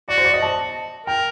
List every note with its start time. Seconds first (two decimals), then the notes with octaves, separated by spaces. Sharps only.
0.08 F#4 D5
0.18 C5
0.25 D5
0.34 D#5
0.42 A5
1.07 A#4 G5